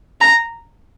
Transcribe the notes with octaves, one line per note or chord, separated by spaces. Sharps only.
A#5